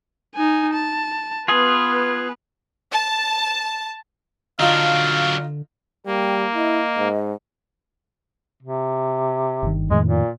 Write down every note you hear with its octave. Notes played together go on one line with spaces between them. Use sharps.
D#4 G#5
A5
B3 F4 G#4 B4
A5
D3 F#3 D4 D#4 F4 F5
G3 A#3 G5
E4 D#5
G#2
C3
G1 D#3
F2 A2 D#3 G#3
A#2